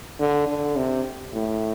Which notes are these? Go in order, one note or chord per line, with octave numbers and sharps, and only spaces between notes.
D3
D3
C3
A2